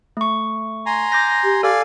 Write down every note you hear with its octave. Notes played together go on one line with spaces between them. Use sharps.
A3 C#6
G#5 A#5 C6
D6 G6 A#6
G4
A4 D5 F5 G#5